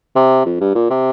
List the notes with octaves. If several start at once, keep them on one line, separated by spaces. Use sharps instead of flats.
C3
F2
G2
A#2
C3